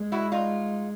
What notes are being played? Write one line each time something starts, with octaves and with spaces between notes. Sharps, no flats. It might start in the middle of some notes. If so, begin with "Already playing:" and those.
Already playing: G#3
E4 F#4
D#4 F4